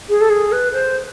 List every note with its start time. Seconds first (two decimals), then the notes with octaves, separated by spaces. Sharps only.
0.09 G#4
0.21 A4
0.30 G#4
0.52 B4
0.72 C5